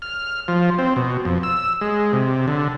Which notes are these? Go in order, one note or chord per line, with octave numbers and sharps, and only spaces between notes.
F6
F3
C4
B2
F2
E6
G#3
C3
D3